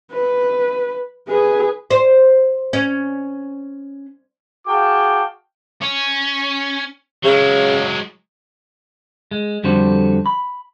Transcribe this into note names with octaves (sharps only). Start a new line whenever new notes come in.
B4
G#4 B4
C5
C#4
F#4 G#4 F5 G5 A5 D6
C#4
C#3 F#3 G#3
G#3
F2 D3 G3 F#4 A4 C5
B5